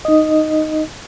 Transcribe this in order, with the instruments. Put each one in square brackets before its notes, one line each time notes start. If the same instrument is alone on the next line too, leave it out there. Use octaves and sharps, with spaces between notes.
[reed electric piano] D#4 D#5